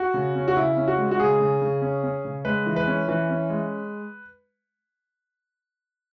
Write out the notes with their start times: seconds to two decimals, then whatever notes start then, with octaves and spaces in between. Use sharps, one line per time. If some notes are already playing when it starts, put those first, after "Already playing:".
Already playing: F#4
0.14 C#3
0.35 C#4
0.48 F#4
0.57 C#3 E4
0.77 C#4
0.88 F#4
0.98 G#3
1.11 F#4
1.20 C#3 G#4
1.40 C#3
1.62 C#3
1.82 C#4
2.04 C#4
2.25 C#3
2.45 G#3 B4
2.66 E3
2.76 B4
2.87 C#4
3.08 E3 B4
3.30 C#4
3.50 G#3